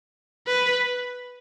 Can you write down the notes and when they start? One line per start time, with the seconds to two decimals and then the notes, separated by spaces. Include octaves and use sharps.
0.47 B4